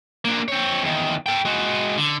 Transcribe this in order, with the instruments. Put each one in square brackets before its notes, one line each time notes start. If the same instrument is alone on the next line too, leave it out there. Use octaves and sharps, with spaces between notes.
[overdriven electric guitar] A#3 D4
C4 C#5
E2 D#3
A4 G5
G#3 F#4
D3